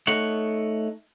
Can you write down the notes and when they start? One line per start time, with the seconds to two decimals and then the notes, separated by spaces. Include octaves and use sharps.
0.07 A3 D#4 C#5 F#5